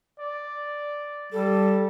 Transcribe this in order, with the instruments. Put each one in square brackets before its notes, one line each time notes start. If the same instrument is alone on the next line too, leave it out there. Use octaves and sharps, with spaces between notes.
[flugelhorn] D5
[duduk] G3 [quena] A4